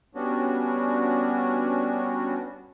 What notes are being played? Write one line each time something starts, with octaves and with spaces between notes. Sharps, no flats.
G3 B3 C#4 D4 F#4